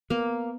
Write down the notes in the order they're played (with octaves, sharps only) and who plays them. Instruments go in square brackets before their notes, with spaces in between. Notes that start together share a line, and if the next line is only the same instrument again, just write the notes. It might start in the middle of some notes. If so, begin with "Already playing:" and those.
[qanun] A#3 [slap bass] B3